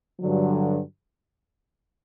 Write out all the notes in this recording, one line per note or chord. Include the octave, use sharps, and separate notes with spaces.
G2 D3 F#3